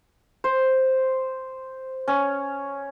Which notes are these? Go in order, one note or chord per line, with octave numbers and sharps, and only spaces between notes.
C5
C#4